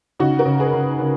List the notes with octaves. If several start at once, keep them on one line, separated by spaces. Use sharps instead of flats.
C#3 D#4 F#4
F#4 A#4
C#3
G#4 B4
C#3
C#3